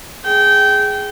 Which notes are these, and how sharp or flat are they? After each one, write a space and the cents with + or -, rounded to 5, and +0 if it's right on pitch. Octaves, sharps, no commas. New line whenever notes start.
G#4 +0 G5 -20